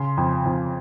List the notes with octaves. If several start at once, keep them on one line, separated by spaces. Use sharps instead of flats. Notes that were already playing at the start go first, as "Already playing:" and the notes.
Already playing: C#3 C6
F2
F2